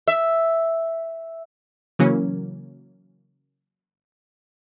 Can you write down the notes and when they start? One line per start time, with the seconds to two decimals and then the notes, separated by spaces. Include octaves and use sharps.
0.08 E5
1.99 C#3 E3 F#3 A#3 C#4